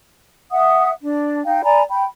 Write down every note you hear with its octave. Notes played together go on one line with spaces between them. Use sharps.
E5 F#5 D#6
D4
D#4 F5 G5
D5 G#5 A#5 B5
G5 B5